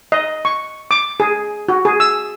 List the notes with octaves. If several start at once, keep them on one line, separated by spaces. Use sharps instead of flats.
D#5
C#6
D6
G#4
F#4
G#4
E6